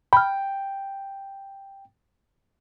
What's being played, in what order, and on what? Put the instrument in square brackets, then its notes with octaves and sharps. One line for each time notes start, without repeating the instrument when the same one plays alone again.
[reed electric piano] G5 [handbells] B5 F6